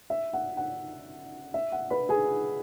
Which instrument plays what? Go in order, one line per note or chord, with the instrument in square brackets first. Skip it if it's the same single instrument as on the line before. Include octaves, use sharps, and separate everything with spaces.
[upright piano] E5
F#5
F#5
E5
F#5
B4 B5
G#4 G#5